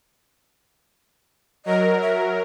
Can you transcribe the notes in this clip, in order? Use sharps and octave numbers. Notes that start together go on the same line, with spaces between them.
F#3 A#4 D#5
E5